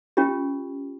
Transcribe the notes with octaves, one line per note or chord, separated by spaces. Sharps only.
C#4 F4 G4